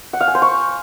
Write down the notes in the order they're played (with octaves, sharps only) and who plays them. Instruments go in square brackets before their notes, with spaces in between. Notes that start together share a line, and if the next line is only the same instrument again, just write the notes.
[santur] F#5
F5
G#5
C5
C#6